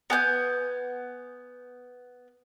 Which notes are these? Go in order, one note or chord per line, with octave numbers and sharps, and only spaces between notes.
B3 G#5 F#6 G6